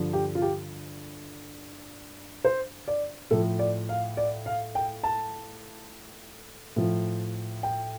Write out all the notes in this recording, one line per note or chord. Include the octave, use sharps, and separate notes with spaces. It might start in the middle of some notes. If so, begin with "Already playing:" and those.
Already playing: G2 D3 F3
G4
F4
G4
C5
D5
A2 F3 A4
D5
F5
D5
F5
G5
A5
A2 F3
G5